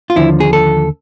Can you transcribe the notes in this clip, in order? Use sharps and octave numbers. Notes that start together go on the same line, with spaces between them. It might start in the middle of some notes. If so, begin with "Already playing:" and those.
F4
D#2 D3 F3 E4
G#4
A4